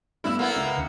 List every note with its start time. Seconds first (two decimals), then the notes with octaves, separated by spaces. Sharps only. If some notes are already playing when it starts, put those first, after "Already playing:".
0.24 G2 A3 B3 E4 E6
0.39 A#3 B3 E4 A4
0.56 C#2 E5
0.74 D#2 D3 C#7